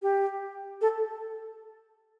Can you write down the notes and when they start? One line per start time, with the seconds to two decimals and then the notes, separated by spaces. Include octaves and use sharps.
0.02 G4
0.81 A4